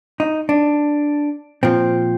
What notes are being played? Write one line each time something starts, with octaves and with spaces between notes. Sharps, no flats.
D#4
D4
A#2 F3 C4